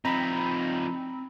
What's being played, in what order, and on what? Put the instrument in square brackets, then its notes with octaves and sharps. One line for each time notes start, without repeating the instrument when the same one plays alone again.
[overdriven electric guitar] F3 D#4 [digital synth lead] C4 [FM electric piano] A#5 B5